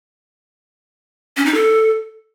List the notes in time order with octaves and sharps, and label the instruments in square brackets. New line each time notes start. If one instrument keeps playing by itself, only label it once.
[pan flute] C#4
D#4
A4